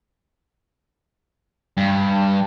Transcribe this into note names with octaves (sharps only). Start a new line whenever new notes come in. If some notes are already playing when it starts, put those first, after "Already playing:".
G2